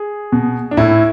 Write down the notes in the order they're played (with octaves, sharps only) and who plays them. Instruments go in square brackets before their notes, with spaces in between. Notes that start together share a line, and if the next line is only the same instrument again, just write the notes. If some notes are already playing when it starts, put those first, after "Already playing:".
Already playing: [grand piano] G#4
B2
D4
A2 E4